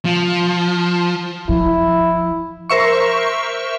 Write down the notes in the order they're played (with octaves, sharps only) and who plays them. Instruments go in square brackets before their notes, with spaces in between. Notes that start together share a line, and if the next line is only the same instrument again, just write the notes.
[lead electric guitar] F3
[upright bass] F3 [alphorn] E4
[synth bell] A#4 C5 E5 C#6